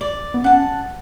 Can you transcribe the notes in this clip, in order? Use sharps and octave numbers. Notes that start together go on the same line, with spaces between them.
D5
B3
C#4 F#5 A5